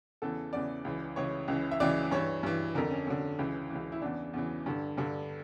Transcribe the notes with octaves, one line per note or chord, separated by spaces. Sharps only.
E2 C#3 E3 A4
E2 C#3 E3 D5
C#2 C#3 E3
C#2 C#3 E3 C#5
C#2 C#3 E3
E5
C#2 C#3 E3 D5
G2 E3 C#5
G2 E3
F2 D3 A#4
C#4
F2 D3 C#4
C#2 C#3 E3
C#2 C#3 E3
E4
E2 C#3 E3 D4
E2 C#3 E3
G2 D3
G2 D3